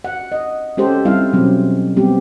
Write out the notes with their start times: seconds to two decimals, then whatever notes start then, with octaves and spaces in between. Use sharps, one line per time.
0.04 F#5
0.32 D#5
0.77 G#3 C#4 G4 A4 C5
1.05 G3 C4 E4 F5
1.33 B2 F#3 G#3 C4 C#4
1.97 G3 B3 C4 G4